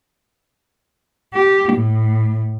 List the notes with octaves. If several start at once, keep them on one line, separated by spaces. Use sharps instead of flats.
G4
A2